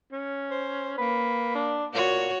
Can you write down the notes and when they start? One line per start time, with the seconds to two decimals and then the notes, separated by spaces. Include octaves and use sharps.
0.12 C#4
0.51 C5
0.98 A#3 B4
1.55 D4
1.94 A#2 F#4 C#5